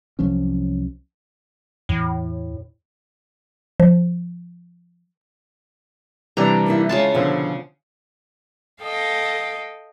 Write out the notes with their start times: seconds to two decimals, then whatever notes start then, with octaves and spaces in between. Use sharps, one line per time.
0.19 C2 F3 F#3 C#4
1.89 E2 A2
3.80 F3
6.37 C3 E3 G3 D4 A#5
6.66 A#3 D#4 E4
6.89 C#3 G#3 F4 A5
7.14 B2 D3 F3 C4
8.83 A4 D#5 F5 G5